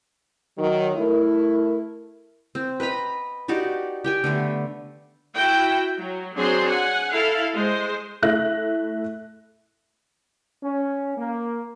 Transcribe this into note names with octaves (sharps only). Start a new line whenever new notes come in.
D#3 F#3
A3 E4 A#4
C4
B4 D#5 A#5 B5
D#4 F#4 G4 D5
G4 G5 G#5
D3 A3 B3
E4 F#4 G5
F#3
F#3 C4 D4 G#4 C5 C6
F#5 G#5
E4 A4 F5
G#3 C5
A3 E4 E5 F#6 A#6
C#4
A#3